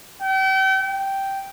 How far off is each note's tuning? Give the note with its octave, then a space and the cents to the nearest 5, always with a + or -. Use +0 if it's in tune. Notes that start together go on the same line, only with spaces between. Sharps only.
G5 -40
G5 -5